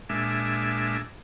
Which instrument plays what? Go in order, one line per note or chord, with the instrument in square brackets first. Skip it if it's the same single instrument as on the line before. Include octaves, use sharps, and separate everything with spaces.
[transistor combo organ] A#2 G#3 D4 E5